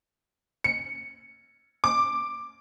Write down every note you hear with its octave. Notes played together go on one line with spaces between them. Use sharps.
C#7
D6